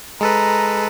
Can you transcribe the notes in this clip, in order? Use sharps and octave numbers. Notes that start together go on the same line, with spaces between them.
G#3 A4 B4 A#5